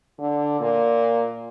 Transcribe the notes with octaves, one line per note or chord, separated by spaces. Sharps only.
D3
A#2